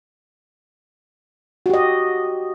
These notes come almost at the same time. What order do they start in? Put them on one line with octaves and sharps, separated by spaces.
F#4 G4 D#5